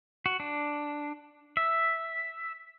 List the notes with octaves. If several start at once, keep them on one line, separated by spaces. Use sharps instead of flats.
F#4
D4
E5